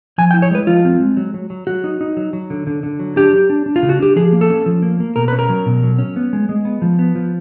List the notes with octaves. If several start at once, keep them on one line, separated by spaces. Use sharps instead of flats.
F3 G#5
G5
E4
C#5
G#3 B4
F3 F4
C4
G#3
F#3
F#3
F#3
F#3 F#4
D#4
D#4
F#3
F#3
D3
D3
D3
F#3
D4 G4
F#3
D4
D4
F4
C#3
F#4
D4 G4
F3 G#4
A#3
A4
C#4
F3
A#3
A#3
B2 A#4
C#4 B4
A#4
F#3
B2
F#3
C#4
B3
G#3
G#3
B3
F3
B3
F3